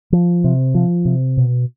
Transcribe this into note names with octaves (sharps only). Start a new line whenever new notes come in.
F3
C3
F3
C3
B2